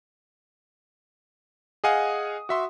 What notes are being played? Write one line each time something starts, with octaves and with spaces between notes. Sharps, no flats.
G#4 D#5 F5 F#5 G#5 D#6
F#4 E5 C6